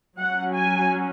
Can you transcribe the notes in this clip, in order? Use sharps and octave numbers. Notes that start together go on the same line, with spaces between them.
F#3 C#4 F#5
G#5